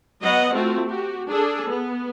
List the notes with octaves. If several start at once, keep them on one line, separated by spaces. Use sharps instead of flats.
F#3 B3 D#5 F#5
A3 C4 F4 F#4
F#4 G4
D4 G#4 A4
B3